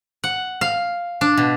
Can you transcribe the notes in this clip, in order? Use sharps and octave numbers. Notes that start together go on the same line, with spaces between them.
F#5
F5
D4
B2